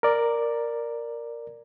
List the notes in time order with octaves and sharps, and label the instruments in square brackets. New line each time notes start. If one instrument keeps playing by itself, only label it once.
[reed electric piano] A#4 D5